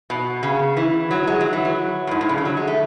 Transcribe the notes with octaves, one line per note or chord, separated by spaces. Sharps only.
B2
C#3
E3
F#3
G#3
F#3
E3
F#3
A2
G#2
A2
C#3
D3
F#3
G#3
A3